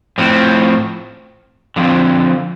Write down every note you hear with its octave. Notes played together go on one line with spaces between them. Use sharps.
A2 F3 C4
D3 F3 C4